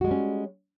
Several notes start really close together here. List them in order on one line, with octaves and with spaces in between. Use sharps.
F#4 G#3 G3 C#4